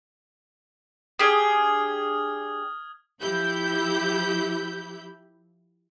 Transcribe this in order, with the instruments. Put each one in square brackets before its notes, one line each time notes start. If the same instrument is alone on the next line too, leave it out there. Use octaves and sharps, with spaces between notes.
[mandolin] D4 G4 G#4 [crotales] D#6 F6 G#6
[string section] F3 E4 G4 B5 G6